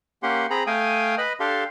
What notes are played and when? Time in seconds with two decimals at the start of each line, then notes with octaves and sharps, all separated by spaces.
0.23 A#3 C#4 G4 F#5 C6
0.50 C4 G#4 A#5 B5
0.67 A3 F5 G5 G#5 D#6
1.18 B4 D#5 B5
1.40 D4 G4 A4 F5 C6